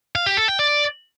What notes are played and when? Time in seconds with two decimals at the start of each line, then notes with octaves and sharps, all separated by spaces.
0.15 F5
0.26 G4
0.37 A4
0.48 G5
0.59 D5